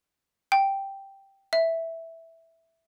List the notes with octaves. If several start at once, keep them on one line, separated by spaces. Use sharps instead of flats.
G5
E5